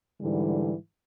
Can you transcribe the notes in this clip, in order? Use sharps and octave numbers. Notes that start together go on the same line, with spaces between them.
G#2 D3 E3 G3